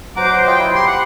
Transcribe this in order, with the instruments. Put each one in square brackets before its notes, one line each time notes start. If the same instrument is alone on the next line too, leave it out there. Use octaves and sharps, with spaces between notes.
[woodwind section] B2 F#3 C5 [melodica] F#5 A#5 [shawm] D6
[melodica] F4 D#5 [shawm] G5
[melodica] E4
[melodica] G4 [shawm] C6
[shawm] F#5